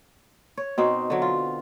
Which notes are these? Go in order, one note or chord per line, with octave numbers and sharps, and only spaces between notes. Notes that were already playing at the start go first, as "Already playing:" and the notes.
C#5
B2 C4 D#4
D3 F#3
F4